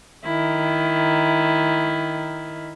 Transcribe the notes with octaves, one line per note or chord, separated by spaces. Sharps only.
D#3 E4